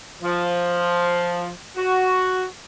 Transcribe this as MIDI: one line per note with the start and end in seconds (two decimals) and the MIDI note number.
0.23 1.48 53
1.76 2.43 66